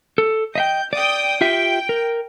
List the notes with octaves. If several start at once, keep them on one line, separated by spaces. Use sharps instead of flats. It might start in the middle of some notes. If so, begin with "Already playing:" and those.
A4
D#5 E5 G5 G6
D5 G5 D#6
F4 G4 E5 G5
A#4